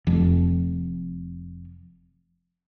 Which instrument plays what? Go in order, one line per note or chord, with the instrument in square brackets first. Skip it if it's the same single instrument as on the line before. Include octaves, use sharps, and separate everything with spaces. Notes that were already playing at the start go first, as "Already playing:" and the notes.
[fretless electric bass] F1 F2